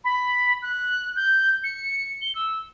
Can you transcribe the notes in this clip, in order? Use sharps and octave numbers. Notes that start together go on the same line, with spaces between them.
B5
F#6
G6
C#7
G7
E6